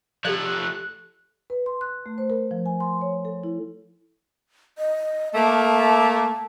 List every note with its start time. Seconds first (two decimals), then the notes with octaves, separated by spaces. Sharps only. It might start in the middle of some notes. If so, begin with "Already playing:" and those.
0.25 F3 A3 G4 A4 D5 F#6
1.50 B4
1.66 C6
1.81 F#6
2.06 A3
2.18 C5
2.30 A#4
2.51 F3
2.66 G#5
2.80 C6
3.01 C#5
3.25 A4
3.43 E4
4.78 D#5
5.34 A3 A#3 A5